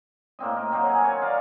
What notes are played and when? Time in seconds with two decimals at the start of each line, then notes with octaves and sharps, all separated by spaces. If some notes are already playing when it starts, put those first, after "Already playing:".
0.39 A2 A#3 C4 D#5
0.56 A#4
0.71 F#3 A#3 C4 D#4
0.86 F#5 G#5
1.04 C#5
1.22 A#4 D5 F5